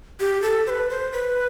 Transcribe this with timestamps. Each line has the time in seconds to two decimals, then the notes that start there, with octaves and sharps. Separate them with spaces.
0.20 G4
0.42 A4
0.67 C5
0.70 B4
0.90 C5
1.12 B4